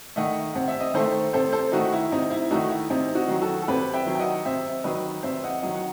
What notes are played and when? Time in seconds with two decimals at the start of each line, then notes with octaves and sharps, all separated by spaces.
0.16 D#3 A3 D#5 F#5
0.53 C3 F#5
0.68 E5
0.80 D#5
0.94 D#3 A3 A4 C5
1.33 C3 A4 C5
1.53 A4 C5
1.72 D#3 A3 D#4 F#4
1.92 E4
2.12 C3 D#4
2.30 E4
2.51 D#3 A3 D#4 F#4
2.69 E4
2.90 C3 D#4
3.15 D#4 F#4
3.28 D#3 F#3
3.41 F#4 A4
3.62 A4
3.68 C3 G4 B4
3.93 E5 G5
4.06 D#3 F#3
4.15 G5
4.19 D#5 F#5
4.45 C3 C5 E5
4.84 D#3 F#3 B4 D#5
5.23 C3 C5 E5
5.44 D#5 F#5
5.62 D#3 F#3 D#5 F#5
5.75 F#5